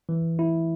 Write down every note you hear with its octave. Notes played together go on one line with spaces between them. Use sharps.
E3
E4